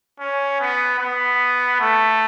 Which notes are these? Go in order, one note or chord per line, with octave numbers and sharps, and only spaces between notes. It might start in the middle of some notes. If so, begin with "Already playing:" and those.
C#4
B3
B3
A3